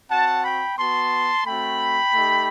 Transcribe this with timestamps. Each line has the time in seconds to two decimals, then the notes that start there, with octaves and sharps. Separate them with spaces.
0.11 C4 F#4 F#5 A5
0.45 G5 B5
0.79 B3 F#4 A5 C6
1.46 A3 C4 F#4 G5 B5
2.15 A3 D#4 G4